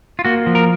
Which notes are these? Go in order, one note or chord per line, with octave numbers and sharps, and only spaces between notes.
F4
A#3 F#4
F3
A#4